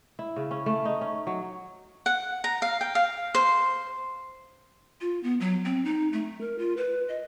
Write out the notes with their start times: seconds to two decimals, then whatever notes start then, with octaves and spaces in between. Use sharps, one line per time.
0.19 E4
0.36 C#3
0.51 C#4
0.66 A3
0.85 D#4
1.01 C#4
1.27 F#3
2.06 F#5
2.44 A#5
2.62 F5
2.81 G5
2.95 F5
3.35 C5
5.01 F4
5.23 B3
5.40 F#3
5.65 C4
5.85 D#4
6.13 A3
6.41 A#4
6.58 F4
6.77 B4
7.09 D#5